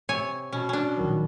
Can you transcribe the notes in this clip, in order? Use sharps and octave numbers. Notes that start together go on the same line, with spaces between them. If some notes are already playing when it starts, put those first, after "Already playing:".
C3 C#5 G#5
B2 C#4
C#4 D4
A#1 D#3 F#3